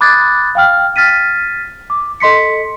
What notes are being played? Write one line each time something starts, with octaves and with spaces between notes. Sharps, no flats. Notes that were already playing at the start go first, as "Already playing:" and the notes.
B5 D6 D#6 F#6 G#6 A6
F5 G5 F6
F6 A6 B6 D#7
D6
A4 D#5 C6 B6 C#7